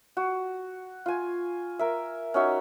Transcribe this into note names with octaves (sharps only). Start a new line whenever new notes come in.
F#4
F4 G#5
A#4 E5
C#4 D#4 F#4 E5